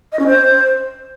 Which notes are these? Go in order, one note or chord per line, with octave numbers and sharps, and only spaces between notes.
D#5
C#4
C5